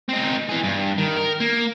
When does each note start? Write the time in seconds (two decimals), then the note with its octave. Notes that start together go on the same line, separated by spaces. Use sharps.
0.09 C4 D#4
0.49 E3 G#4
0.63 G2
0.98 D#3
1.17 A#4
1.40 A#3